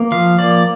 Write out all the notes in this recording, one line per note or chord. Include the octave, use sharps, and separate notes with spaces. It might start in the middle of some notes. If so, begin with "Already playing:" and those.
Already playing: A#3
F3 F5
A#3 D5